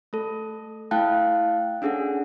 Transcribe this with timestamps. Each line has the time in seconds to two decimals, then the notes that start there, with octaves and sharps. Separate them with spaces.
0.13 A3 A4
0.91 A3 E4 F5 G5 A5 F#6
1.82 C#4 D4 G#4 A4 F#5